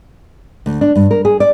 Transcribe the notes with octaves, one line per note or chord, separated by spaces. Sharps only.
D2
D4
G2
A#4
G#4
D5